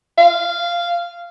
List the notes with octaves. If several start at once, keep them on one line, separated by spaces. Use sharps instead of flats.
F5